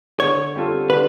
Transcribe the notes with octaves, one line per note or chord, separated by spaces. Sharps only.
D3 C#5
G3 C4 F4 A4
D3 B4